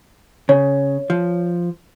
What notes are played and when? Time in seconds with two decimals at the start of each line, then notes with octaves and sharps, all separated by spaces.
0.49 C#3 C#5
1.10 F3